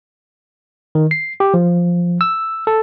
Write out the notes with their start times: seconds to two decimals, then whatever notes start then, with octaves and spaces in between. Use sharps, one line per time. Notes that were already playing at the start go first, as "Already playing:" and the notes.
0.95 D#3
1.11 C7
1.40 G4
1.54 F3
2.21 E6
2.67 A4